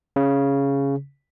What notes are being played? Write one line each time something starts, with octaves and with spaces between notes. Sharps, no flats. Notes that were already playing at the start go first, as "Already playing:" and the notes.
C#3